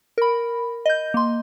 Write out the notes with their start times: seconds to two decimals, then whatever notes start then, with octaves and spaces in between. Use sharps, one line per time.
0.18 A#4 B5
0.86 D#5 G6
1.14 A#3 C6